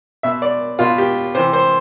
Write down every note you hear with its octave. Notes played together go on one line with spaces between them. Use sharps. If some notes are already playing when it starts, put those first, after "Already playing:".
B2 E5
D5
B2 F4
G4
C3 E3 C5
C5